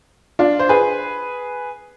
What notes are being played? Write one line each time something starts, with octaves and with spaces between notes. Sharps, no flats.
D4 F4
C5
G#4 B4